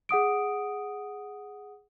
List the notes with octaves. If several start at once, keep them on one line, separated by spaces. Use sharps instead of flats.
G#4 F#5 D#6 D7